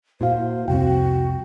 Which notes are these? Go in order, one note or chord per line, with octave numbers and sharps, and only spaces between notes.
A#2 E4 F#4 C5 F5
F1 C2 C4 F#4 G5